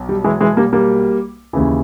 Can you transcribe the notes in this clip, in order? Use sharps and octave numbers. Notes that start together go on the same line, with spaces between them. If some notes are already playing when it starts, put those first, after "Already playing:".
Already playing: B1
G3
E3 G#3
E3 G#3
G3 A#3
G3 A#3
D#2 C#3 E3